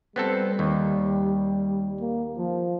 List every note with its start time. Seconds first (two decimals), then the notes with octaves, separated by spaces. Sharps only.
0.16 G3 B3 C4 A4
0.59 D#2
2.00 A#3
2.38 F3